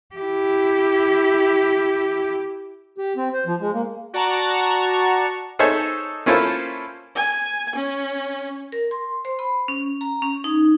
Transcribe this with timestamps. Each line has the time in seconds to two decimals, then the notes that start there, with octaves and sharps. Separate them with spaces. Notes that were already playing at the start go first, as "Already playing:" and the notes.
0.15 E4 G4
2.98 G4
3.17 C4
3.33 C5
3.46 F3
3.61 G#3
3.74 A#3
4.13 F#4 D5 F#5 A5 A#5 C#6
5.59 D#4 G#4 A4 C5 C#5 E5
6.26 A#3 C#4 E4 F4 A4 C5
7.15 G#5
7.75 C#4
8.72 A#4
8.91 C6
9.25 C5
9.39 B5
9.68 C#4
10.01 A#5
10.22 C#4
10.44 D#4